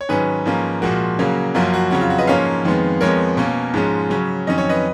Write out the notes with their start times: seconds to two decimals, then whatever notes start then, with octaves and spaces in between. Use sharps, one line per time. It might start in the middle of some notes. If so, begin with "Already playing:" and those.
0.01 C#5
0.09 G#2 D#3 F#3 C#4 G#4 B4
0.46 G#2 F3 A#3 C#4
0.82 A#2 F3 G#3 F#4 A#4
1.19 C#3 F#3 A#3 C#4
1.55 F#2 F3 A#3 C#4 F#4
1.74 F#4
1.91 F2 C#3 F#3 F#4
2.01 F4
2.10 F#4
2.18 B4 D#5
2.27 G#2 F3 A#3 C#4 C#5 F5
2.65 F2 D#3 G#3 B3
3.01 F2 F3 G#3 B3 A#4 C#5
3.37 B2 A#3 C#4
3.74 G#2 F3 G#3 C#4
4.10 C#3 F#3 C#4
4.47 F2 D#3 F#3 C#4 D#5
4.58 C#5
4.69 B4 D#5